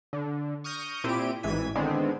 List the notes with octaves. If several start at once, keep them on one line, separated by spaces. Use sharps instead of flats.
D3
C#6 D#6 F6 G6 A#6 D#7
A#2 C4 E4 G4 D7 D#7
A1 G#2 E3 G#6 B6 D#7
D3 D#3 G#3 B3 C4